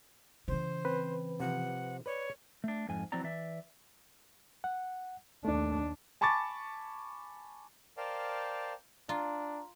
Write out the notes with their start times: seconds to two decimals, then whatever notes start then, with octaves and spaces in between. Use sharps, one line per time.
0.48 C#3 E3 C5
0.85 C4 B4
1.40 C3 F3 F#5
2.06 B4 C#5 D5
2.64 A3 D4
2.89 F2 G#2 G#5
3.12 F3 F#3 C4 E4 D5 A#5
3.24 E3 D5 E5
4.64 F#5
5.45 D#2 A3 D4
6.21 G#5 A5 B5 C#6 D6 A6
7.97 A#4 C5 D5 F5 G5 A5
9.09 D4 F4 A#5